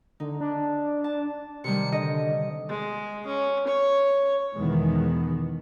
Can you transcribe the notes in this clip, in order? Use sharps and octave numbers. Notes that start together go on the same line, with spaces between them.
D3 D#4
D4
A5
C3 D#3 G3 C#7
D3 D#5
G#3
C#4
C#5
E2 B2 D#3 E3 G#3 B3